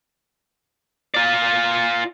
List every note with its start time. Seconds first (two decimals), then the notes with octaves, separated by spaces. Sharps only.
1.14 F4 D5